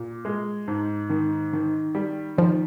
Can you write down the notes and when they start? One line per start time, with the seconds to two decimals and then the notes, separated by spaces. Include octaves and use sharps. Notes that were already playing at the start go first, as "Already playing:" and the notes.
Already playing: A#2
0.25 G#3
0.68 G#2
1.10 D#3
1.53 D#3
1.95 G3
2.38 D#3 F3